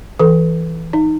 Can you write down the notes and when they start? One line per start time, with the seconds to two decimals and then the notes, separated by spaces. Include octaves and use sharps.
0.19 E3 A4
0.93 D#4